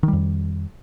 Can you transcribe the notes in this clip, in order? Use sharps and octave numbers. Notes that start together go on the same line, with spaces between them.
F2 D#3 G3